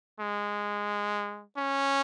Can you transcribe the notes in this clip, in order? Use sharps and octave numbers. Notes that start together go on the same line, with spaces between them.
G#3
C#4